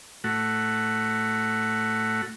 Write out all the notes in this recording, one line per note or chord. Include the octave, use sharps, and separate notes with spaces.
A2 A3 F#4 F#5